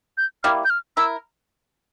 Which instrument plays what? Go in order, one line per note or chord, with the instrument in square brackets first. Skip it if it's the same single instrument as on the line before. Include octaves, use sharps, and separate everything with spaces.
[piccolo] G6
[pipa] G3 A#3 E4 [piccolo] F6
[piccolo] G6
F6
[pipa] E4 A#4 [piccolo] E6